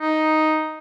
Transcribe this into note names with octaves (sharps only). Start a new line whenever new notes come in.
D#4